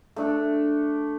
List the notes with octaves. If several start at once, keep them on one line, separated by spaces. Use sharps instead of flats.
A3 D4 A4